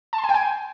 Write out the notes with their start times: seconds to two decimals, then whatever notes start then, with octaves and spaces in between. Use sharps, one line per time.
0.13 A5
0.18 C6
0.24 G#5
0.29 G5
0.34 G#5